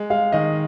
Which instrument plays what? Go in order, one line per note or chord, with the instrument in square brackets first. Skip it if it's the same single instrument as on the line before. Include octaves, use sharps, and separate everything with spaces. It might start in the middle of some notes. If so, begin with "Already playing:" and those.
Already playing: [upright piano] G#3
[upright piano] G#3 [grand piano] F5
[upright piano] D#3 [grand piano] D#5